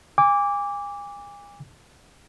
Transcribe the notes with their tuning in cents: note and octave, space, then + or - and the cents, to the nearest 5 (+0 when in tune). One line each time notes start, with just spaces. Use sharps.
G#5 -35 D6 -15